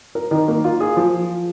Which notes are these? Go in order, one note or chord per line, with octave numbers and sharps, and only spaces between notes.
A#4
D#3
A#3
F4
G#4
F3